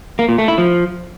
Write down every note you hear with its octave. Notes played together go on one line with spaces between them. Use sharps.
A#3
A#2
A3
E4
F3